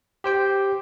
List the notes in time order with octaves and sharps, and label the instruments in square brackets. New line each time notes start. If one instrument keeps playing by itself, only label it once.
[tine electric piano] G4 C5 G5